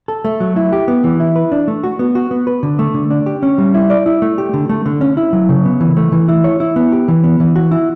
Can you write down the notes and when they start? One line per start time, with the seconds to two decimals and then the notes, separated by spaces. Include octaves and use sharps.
0.08 A4
0.25 A3
0.40 F#3
0.56 E4
0.73 G4
0.88 B3
1.04 E3
1.20 E4
1.36 B4
1.52 D4
1.68 A3
1.84 F#4
1.99 B3
2.15 F#4
2.31 B3
2.47 B4
2.63 D3
2.79 A3
2.94 D3
3.11 D4
3.26 G4
3.43 C#4
3.58 G3
3.74 E4
3.90 D5
4.06 E4
4.22 A3
4.38 G4
4.53 D3
4.69 A3
4.86 D3
5.01 C#4
5.17 E4
5.33 F#3
5.49 C#3
5.65 B3
5.81 E3
5.97 A3
6.12 E3
6.28 E4
6.44 C#5
6.60 E4
6.76 B3
6.92 G4
7.08 E3
7.24 B3
7.40 E3
7.56 F#4
7.71 E4